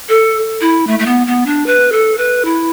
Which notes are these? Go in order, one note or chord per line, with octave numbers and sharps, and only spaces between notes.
A4
E4
A3
A3
B3
B3
D4
B4
A4
B4
E4